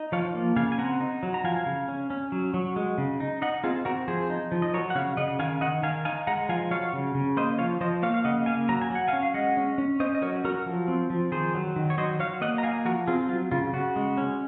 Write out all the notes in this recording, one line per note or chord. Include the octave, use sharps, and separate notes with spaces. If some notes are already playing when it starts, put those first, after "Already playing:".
Already playing: D#4
F3 C#5 F5
A#3
C#3 F5 G#5
G#5
C4 F#5 A#5
D#4
F#3
A#5
F3 F5 G#5
C#3
C#4
C#4
F#3
F#3
G#3
C#3
D#4
D#4 D#5 F#5
C4 F4 G#4
C4 F#4 A#4
F3 G#4 C5
D#4
F3
D#5
F#3 A#4 C#5
F#5
C#3 C#5 F5
C#3 D#5 F#5
D#3 F5 G#5
D#3 D#5 F#5
D#3 F5 G#5
D#4 F5 G#5
G#3 F#5 A#5
F3 F5 G#5
F#3 C#5 F5
C#3
C#3
A#3 C5 D#5
F3 C#5 F5
F3 C5 D#5
A#3 C#5 F5
F5
C#3 D#5 F#5
A#3 F5 G#5
F#3 A#5
G#5
F#3
F#5
F5 G#5
C#4
F5
G#3 D#5 F#5
C#4
C#4
C#4 C5 D#5
D#5
F#3 A#4 C#5
F#3 F#4 A#4
F3
C4
F3
D#3 G#4 C5
F#3
D#3
C#5
F#3 C5 D#5
F#3 C#5 F5
A#3 D#5 F#5
A#5
D#4 F5 G#5
F3 F#4 A#4
C4 F4 G#4
F#3 F4
C#3 F4
C#3 F#4
G#3
C#4